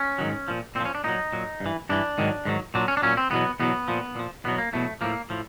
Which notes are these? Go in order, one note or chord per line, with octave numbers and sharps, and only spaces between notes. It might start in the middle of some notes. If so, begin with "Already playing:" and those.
Already playing: C#4
G#2 D#3 F#3
A#2 F3
A#2 C4
F3
C#4
D4
A#2 F#3 D#4
A#2 F#3
G2
E3
G2 E3 D4
G#2 D#3 F#3
G#2 D#3 F#3
A#2 F#3 D4
C#4
D4
A#2 F#3 C#4
C4
E2 B2 F#3 B3
E2 B2 F#3 B3
A#2 F3
A#2 F3
E2 B2 F#3 B3
A#3
E2 B2 F#3 A3
A2 F3 A#3
A2 F3